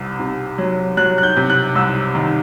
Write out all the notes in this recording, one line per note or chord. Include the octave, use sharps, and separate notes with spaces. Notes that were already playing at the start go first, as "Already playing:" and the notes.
Already playing: C2 C3
C3
F#3
F#3 F#6
F#6
G6
C3
F#6
C2 E6
D#3